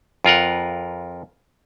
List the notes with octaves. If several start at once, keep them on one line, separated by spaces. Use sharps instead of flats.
F2 F4 A#4 F#5